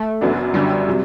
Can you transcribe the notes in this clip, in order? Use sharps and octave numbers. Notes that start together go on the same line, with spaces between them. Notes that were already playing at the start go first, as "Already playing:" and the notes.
Already playing: A3
F#1 F#2 F#3 B3 D4
G1 F#2 D3 F#3 G3
C3 F#3